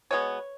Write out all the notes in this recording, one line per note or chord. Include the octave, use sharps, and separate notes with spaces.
B2 G#3 B3 C#5